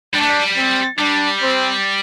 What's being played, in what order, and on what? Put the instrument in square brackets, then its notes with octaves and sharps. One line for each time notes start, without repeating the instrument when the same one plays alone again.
[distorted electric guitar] G3 [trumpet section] D4
[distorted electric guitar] A3
G3
[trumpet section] C4
[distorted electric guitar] G3 [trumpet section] D4
[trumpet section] C4